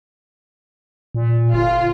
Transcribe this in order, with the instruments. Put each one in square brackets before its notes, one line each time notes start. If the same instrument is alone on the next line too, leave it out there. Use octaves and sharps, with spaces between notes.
[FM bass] A#2
[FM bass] G1 [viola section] F4